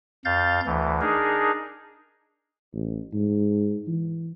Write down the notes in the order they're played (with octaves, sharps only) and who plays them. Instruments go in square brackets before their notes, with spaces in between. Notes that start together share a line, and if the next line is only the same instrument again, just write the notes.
[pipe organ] F2 F5 G6 A6
D2 E3
D4 D#4 G#4 A#4
[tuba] A1
G#2
E3